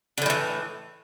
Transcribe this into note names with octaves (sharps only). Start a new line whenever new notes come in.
A2 D3 E3 G3